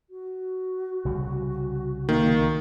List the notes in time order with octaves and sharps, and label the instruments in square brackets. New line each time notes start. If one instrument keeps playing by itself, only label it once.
[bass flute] F#4
[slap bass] C2 C#3 G3
[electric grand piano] D#3 [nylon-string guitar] A#3